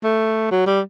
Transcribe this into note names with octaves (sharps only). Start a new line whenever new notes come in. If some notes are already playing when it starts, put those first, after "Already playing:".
A3
F#3
G3